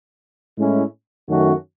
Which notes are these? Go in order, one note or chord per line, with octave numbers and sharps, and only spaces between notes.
A2 G#3 C#4 E4
F#2 D#3 A3 C#4 F#4